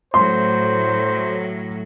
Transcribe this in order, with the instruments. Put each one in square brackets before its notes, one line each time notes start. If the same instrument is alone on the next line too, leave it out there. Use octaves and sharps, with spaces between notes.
[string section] A2 F#3 [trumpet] C5 [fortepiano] C6